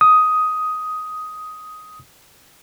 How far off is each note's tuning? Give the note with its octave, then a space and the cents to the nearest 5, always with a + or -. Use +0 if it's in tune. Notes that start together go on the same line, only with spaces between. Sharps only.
D#6 +10